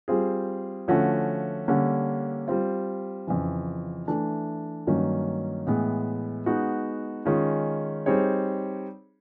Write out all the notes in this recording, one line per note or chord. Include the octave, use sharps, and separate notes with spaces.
G3 C4 F4 G#4
D3 F3 A3 C#4 F#4
D3 G3 A#3 C#4
G3 C4 F4
F2 C#3 E3
E3 A3 D4
G2 D#3 F#3 A#3 C#4
A2 E3 G#3 B3
G#3 B3 D#4 F#4
D#3 G#3 C#4 F4
G3 C4 D#4 G#4 C#5